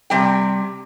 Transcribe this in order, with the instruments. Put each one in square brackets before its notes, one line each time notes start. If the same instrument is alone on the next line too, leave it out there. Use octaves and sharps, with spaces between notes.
[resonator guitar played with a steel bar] C3 G3 G5